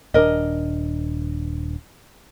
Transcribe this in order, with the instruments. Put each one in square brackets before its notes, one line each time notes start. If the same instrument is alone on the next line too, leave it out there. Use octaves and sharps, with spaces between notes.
[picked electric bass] D#1 C4 D4 [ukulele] A#4 D#5